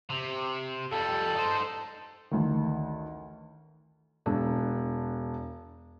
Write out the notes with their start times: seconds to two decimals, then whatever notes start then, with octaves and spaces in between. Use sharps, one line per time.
0.10 C3
0.92 F2 G3 A4
1.36 D#4 C5
2.31 A1 D2 D#3
4.26 E1 D4